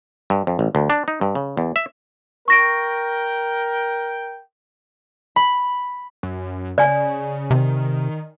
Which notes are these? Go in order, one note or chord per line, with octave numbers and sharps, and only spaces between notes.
G2
F2
A1
D2
D4
D#4
G2
C#3
E2
E5
A#4 G5 C#6 A#6 D7
B5
F#2
C#3 D5 G#5
C3 D#3